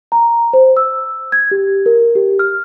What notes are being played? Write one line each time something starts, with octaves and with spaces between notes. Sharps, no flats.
A#5
C5
E6
G#6
G4
A#4
G4
F6